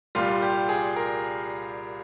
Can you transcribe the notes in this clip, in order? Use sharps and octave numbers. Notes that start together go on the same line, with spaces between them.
C2 A#2 G3 F4
G4
G#4
A#4